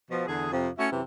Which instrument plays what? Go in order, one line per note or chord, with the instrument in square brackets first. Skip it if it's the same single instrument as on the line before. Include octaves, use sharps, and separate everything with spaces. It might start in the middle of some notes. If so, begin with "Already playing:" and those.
[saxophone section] B2 F3
E2 D3 G#4
F2 C3 F3
A3 C#4 E4 F#4
F#2 C3 E3